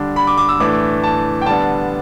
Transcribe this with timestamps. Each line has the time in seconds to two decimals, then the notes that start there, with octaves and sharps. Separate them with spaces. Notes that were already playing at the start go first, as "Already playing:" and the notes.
Already playing: D3 G3 D4
0.16 B5
0.27 D6
0.38 D6
0.49 E6
0.60 A2 E3 A3 D4 D6
1.04 A5
1.42 G5
1.46 D3 G3 B3 D4 A5